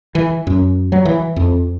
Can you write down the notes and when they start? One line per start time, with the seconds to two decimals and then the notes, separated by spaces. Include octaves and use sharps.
0.15 E3
0.47 F#2
0.92 F#3
1.05 E3
1.36 F2